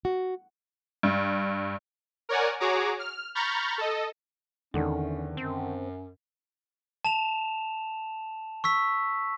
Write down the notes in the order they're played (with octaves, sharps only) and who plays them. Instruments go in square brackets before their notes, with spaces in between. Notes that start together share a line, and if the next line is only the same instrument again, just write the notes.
[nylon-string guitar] F#4
[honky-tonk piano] G2
[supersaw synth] A#4 C#5 D5 F#5 G#5
F#4 G#4 C#5 A#5 D6
F6
A#5 B5 C#6 F6 G6 A6
A4 D#5
[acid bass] E2 [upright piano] D3 D#3 [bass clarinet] C#4
[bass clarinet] F#2 [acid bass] C4
[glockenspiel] A5 E7 F7
C#6 E6 B6